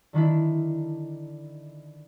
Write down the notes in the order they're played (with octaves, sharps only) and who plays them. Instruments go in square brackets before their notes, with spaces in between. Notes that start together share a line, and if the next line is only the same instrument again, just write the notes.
[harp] D3 D#3 D4 E4